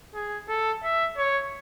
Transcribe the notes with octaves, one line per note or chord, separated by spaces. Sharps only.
G#4
A4
E5
C#5